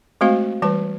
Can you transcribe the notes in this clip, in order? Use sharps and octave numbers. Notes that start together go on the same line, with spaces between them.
G#3 A3 C4 F#4 C5 F5
E3 G3 B4 A5